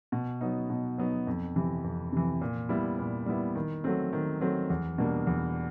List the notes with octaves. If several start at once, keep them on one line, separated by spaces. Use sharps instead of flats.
B2
F#3 B3 D#4
B2
F#3 B3 D#4
F2
C3 E3
F2
C3 E3
A#2
G3 B3 E4
A#2
G3 B3 E4
D#3
F#3 A3 C4
D#3
F#3 A3 C4
E2
B2 G3 A#3 D4
E2